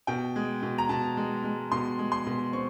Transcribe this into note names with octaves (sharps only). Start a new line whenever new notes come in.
B2 G5
G#3
B2
A#5
B2 A5
G#3
G#3
B2 C6
G#3
C6
B2
C4 C#6